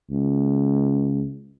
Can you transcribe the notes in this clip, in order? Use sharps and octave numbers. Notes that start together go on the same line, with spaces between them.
C#2